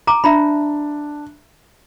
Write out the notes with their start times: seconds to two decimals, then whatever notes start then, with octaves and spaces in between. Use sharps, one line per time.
0.07 A#5 D6
0.24 D4 E5 A#5 B5